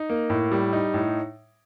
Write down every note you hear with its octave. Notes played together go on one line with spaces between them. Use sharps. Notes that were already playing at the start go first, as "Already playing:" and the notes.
Already playing: D#4
A#3
A2
G3
D#4
A2